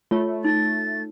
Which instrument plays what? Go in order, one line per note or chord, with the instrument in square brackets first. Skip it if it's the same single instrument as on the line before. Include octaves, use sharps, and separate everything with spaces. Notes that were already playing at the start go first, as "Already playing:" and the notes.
[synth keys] A3 [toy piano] F4 C#5
[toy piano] D#4 [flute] A6